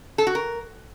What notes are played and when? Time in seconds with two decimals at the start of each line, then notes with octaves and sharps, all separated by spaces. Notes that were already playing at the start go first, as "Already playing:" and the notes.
0.18 A4
0.27 F#4
0.35 A#4